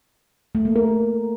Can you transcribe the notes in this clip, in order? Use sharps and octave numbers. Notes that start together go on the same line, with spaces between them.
A3
A#3
A#4